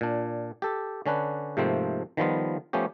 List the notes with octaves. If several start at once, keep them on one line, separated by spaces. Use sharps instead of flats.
A#2 D4
G4 A4
D3 C#4 D4 B4
G#2 C3 F3 A3 A#3 C4
D#3 F3 G3 B3 F4
F3 A3 B3 C#4 G4